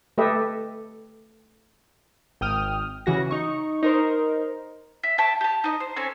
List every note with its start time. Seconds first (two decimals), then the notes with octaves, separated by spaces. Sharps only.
0.18 A3 G4 A4 B4 D#5 E5
2.41 G#1 G5 D#6 F6
3.06 C#3 E3 F#4 A#6
3.31 D#4 C#6
3.83 D#4 A#4 C5
5.03 E5
5.18 E5 G5 A5 C#6
5.41 G4 A5
5.64 D#4 D#5
5.80 C5
5.96 C4 C#4 A4 G#5